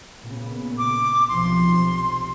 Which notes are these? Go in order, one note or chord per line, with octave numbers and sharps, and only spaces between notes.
A#2 C#3 B3
D6
B1 C3 F3 C6